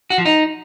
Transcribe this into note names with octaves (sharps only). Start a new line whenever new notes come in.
F#4
F3
D#4